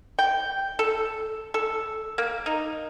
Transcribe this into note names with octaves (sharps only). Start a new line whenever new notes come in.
G5
A4
A4
A#3
D#4